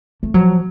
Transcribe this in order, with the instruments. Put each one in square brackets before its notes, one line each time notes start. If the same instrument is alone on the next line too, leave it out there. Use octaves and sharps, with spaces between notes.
[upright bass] A3
[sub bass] F3 [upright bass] F#3